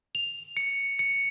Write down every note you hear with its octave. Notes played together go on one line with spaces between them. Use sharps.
F7
C#7
C#7